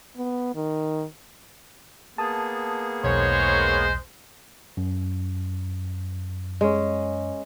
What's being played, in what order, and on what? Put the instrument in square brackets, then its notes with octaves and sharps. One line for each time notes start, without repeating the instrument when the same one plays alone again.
[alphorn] B3
D#3
[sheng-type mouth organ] A#3 B3 G#4 [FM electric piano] A5 D#6
[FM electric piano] B1 E2 [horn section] D#3 A#4 C#5 [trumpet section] G#3 C5
[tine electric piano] F#2
[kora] G#3 C#4